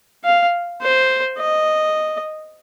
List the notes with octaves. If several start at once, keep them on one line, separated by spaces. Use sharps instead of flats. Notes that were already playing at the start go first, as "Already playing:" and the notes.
F5
C5
D#5